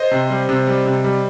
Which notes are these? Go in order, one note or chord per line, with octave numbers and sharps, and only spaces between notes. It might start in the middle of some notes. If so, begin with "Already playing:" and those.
Already playing: C5 D#5
C3
G3
C3
G3
C3
G3